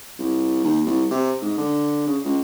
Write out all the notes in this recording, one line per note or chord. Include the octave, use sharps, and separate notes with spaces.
C2
D#2
C2
C3
G#2
D3
C#3
C#2